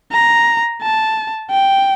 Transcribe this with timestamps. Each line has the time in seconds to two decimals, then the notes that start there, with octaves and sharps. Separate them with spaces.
0.12 A#5
0.82 A5
1.50 G5